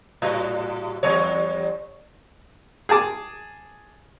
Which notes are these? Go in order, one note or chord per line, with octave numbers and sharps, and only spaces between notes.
A2 G3 F#4
E2 G3 C#5
G#4 G#5 A5 D6